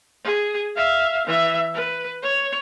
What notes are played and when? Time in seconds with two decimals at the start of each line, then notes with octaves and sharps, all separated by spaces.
0.24 G#4
0.75 E5 F5
1.27 E3 E5
1.74 B4
2.22 C#5